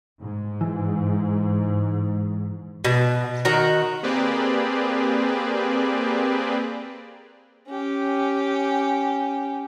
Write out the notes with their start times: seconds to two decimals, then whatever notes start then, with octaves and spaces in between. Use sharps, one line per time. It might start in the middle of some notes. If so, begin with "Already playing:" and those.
0.21 G#2
0.61 E3
2.85 B2
3.45 D#3 F#4 A#5
4.03 A#3 C4 G4 G#4 B4 D5
7.68 C#4 G4